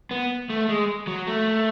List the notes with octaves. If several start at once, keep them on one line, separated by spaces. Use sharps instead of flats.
B3
A3
G#3
F#3
A3